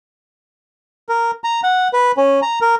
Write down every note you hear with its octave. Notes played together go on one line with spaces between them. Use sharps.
A#4
A#5
F#5
B4
C#4
A#5
A#4